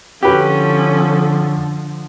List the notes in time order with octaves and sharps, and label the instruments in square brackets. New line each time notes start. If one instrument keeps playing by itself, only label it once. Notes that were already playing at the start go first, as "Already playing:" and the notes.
[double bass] D3 F3 [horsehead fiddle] C#4 A4 [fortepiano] G4 B4